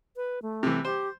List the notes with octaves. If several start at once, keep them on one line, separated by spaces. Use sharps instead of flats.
B4
A3
C3 E3
G4 C5